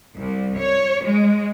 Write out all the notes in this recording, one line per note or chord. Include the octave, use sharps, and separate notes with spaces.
C2
C#5
G#3